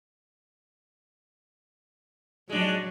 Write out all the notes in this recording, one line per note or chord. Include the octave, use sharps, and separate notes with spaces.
F#3 G#3 D4